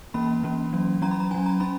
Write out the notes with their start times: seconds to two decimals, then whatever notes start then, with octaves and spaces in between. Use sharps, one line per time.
0.14 E3 A#3 C#4 B5
0.43 E3 A#3 C#4
0.73 F#3 C#4
1.02 F#3 C#4 A#5
1.11 B5
1.20 A#5
1.31 C#4 G#5
1.34 F#3
1.46 A#5
1.60 C#4 B5